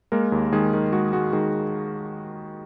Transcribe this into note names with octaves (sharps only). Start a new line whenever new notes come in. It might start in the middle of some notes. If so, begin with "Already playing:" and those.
G#3 A#3 A#4
D#2
D#3 G#3 G#4
D#3
G#3 F#4
G#3 F#4
D#3 G#3 G#4